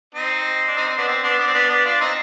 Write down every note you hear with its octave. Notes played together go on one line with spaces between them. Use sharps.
C4 D#4
D4
C4 D#4
C4
B3 D4
C4
B3 D4
B3 D4
C4
B3 D4
B3 D4
D4 F4
C4 D#4